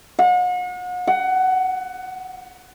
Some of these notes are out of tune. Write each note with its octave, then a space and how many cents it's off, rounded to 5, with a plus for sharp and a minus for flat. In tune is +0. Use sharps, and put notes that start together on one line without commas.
F#5 -40
F#5 +15